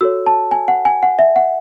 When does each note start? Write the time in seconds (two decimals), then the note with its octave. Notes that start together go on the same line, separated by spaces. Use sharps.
0.01 F#4 A4 C#5 E6
0.26 A5
0.51 G#5
0.68 F#5
0.85 G#5
1.03 F#5
1.19 E5
1.36 F#5